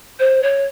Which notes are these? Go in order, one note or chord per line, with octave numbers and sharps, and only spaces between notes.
C5
C#5